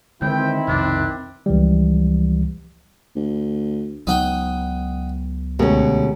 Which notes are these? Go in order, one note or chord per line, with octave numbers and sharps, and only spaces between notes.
D3 D#3 G#3 C4 E4 G5
B1 F2 C3 D4
C#2 E3 F3 G3
D2
C#2 F#3 B3 D#4 F#5 G5
D2 B2 G#3 C#4 G4 A#4